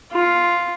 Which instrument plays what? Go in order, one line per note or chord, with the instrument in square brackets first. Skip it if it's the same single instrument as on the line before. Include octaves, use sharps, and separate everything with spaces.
[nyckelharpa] F4